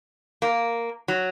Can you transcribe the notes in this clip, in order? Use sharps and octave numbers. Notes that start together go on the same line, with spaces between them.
A#3
F#3